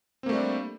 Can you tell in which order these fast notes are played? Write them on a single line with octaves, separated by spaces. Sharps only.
C4 A#3 A3 G3 D4